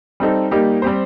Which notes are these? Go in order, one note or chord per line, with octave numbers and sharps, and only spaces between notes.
G3 C4 D#4 A4
G3 A#3 D#4 G4
G3 C4 G4 C5